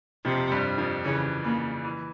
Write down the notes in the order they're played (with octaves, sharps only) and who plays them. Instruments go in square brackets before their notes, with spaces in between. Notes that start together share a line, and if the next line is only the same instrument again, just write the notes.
[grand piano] F2 F3 [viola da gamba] C3
[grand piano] G2 G3
F2 F3
[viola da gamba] C#3 [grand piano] E3
[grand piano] C#3 [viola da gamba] A#3
[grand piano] E3